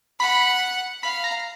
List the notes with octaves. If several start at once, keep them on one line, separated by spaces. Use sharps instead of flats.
F#5 B5
F5 B5
A#5